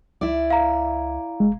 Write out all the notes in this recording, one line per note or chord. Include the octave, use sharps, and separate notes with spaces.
C#2 E4 D5
F5 A#5
F1 G#3